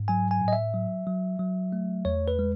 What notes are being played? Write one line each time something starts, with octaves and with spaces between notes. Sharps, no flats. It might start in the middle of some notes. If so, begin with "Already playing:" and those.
Already playing: G#2
F#3 G#5
G#5
A2
D#5
E5
F#3
F#3
F#3
A3
E2 C#5
B4
G#3